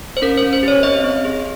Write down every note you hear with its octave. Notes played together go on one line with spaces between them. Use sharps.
C5
C#4 A#4
C5
C#4
C5
G4 C#5
C4 D#5
C4
G#4